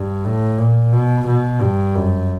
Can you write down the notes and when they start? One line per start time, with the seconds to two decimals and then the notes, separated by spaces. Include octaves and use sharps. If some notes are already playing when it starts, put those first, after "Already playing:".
Already playing: G2
0.25 A2
0.59 A#2
0.92 B2
1.26 B2
1.60 G2
1.95 F#2